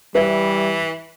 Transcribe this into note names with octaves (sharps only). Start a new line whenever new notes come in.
E3 G3 B4 E5